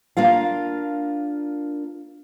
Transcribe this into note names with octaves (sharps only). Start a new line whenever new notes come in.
A#3 D4 F4 F5